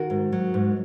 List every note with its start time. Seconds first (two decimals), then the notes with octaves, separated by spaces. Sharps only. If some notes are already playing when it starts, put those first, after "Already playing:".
Already playing: D#3 F#4 A#4
0.10 G#2
0.32 F#3
0.54 G#2